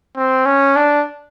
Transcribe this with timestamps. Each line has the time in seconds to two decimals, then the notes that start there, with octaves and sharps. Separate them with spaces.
0.17 C4
0.46 C#4
0.76 D4